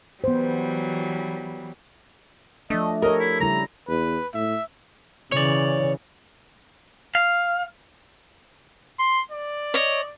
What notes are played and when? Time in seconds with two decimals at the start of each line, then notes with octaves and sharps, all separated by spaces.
0.24 E3 F#3 G3 B3 C5
2.70 F3 A3 D4 D#5
3.02 G4 A4 A#4 C#5 D#5
3.20 E4
3.40 C#3 G3 E4 A#5
3.88 E2 B4
4.34 A2 E5
5.32 C#3 E3 C#5 D5
7.15 F5
8.99 C6
9.31 D5
9.74 C#5 D#5